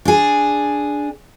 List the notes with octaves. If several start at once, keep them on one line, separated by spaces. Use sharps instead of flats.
D4 G#4